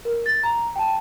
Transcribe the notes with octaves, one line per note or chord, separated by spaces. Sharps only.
A#4
A6
A#5
G5 A5